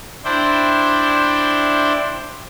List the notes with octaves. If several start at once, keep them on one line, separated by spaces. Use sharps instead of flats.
D4 E4 C5 G5